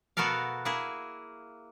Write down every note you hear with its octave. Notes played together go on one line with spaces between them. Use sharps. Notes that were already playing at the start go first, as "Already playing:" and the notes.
B2 B3 F#4 A4 A#4 F5
A#3 E4 G#4